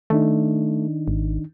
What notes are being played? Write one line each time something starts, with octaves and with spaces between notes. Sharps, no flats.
D#3 A3 D4 D#4
G#1